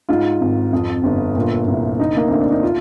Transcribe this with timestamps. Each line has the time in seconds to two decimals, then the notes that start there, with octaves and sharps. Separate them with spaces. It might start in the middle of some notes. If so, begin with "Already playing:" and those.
0.09 G#2 F4
0.40 G#1
0.73 F2
1.04 G1
1.36 A#2
1.67 C2
1.99 D3 D#4
2.16 A#3
2.28 D2 C4
2.40 D4
2.51 D#4
2.63 F4